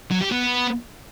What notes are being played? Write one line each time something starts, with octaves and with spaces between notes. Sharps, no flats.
F#3
G4
B3